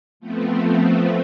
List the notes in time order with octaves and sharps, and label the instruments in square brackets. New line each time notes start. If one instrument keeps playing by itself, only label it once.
[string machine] F3 A3 B3 C4